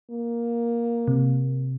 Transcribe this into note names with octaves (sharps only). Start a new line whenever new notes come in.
A#3
C3